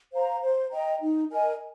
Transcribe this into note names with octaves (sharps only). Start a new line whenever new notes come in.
C5 F5 A#5
C5
D#5 G5 A#5
D#4
A#4 D#5 G#5